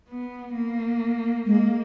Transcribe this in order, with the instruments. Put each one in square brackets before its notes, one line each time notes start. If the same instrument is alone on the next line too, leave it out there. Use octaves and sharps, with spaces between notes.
[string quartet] B3
A#3
[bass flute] G#3 [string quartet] A#3